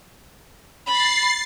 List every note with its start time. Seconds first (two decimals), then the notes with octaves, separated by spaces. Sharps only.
0.87 B5 A6 C7